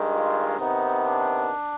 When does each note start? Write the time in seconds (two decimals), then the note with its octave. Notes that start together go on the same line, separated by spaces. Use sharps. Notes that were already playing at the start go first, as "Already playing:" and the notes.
Already playing: G2 D#3 G#3
0.13 F4
0.59 C3 D#3 B3 D#4
1.05 D4